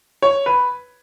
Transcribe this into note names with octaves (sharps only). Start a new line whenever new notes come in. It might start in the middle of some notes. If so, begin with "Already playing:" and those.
C#5
B4